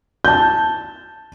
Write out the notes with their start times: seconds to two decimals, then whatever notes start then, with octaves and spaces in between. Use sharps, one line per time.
0.25 A5 G6